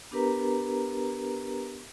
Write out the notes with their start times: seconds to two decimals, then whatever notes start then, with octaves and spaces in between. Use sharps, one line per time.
0.11 B3 D4 G4 A#4 B4 A#5